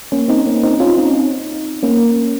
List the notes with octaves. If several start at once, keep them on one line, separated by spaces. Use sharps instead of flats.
A#3 C#4
C4 D#4
A#3 C#4
C4 D#4
C#4 F4
C4 D#4
A#3 C#4